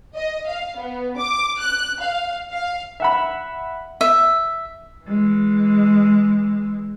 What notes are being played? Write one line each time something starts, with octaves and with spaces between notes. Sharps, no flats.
D#5
F5
B3
D6
F#6
F5
F5
E5 F#5 B5
E5
E3 G#3